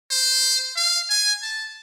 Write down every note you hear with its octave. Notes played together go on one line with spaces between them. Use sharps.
C5
F5
G#5
A5